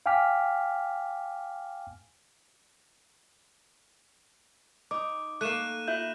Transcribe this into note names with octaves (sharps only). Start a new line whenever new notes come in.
F5 G5 G#5 D6 F6 B6
D#4 D6
A3 A#3 F#6 D#7 E7
F4 E5 G6